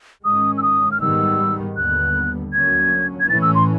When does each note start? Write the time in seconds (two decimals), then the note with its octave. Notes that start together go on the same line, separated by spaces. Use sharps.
0.24 G#2 D#3 G#3 C#4 D#6
0.58 E6
0.62 D#6
0.92 F6
1.01 G#2 D#3 G3 B3 E6
1.77 D#2 D3 G3 B3 F#6
2.53 D2 D3 F#3 A#3 C#4 G#6
3.20 G#6
3.29 A2 E3 A3 C#4 A6
3.42 E6
3.55 C6